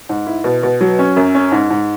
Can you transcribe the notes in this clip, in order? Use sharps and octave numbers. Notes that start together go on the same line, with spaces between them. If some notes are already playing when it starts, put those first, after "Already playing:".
G#2
E4
B2
B2
F#3
C#4
F#2
C#4
G#2
G#2